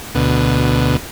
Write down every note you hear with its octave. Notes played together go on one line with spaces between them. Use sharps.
D2 B2